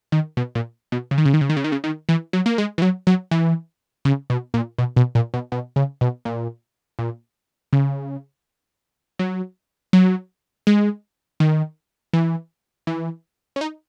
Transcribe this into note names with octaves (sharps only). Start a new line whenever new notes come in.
D#3
B2
A#2
B2
C#3
D#3
C#3
D#3
C#3
D#3
C#3
D#3
C#3
D#3
E3
F#3
A#3
G#3
E3
F#3
F#3
E3
C#3
B2
A#2
B2
B2
A#2
B2
B2
C#3
B2
A#2
A#2
C#3
F#3
F#3
G#3
D#3
E3
E3
C#4
D#4